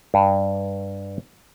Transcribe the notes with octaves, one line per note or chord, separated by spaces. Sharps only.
G2